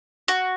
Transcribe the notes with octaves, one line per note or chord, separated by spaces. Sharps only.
F#4